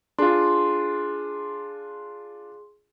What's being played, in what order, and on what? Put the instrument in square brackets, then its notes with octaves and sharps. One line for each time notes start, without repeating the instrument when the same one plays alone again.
[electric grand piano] D4 F4 [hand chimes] G#4 C6